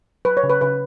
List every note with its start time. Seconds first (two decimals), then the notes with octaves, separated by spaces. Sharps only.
0.25 F#3 B4
0.37 C#5
0.43 C#3
0.50 B4
0.61 C#3 B4